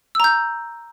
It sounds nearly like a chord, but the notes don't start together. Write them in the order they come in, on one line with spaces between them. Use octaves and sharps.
E6 A#5 G6